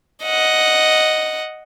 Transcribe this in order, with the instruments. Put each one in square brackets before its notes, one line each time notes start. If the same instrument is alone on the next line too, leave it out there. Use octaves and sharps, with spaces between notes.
[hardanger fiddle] D#5 F#5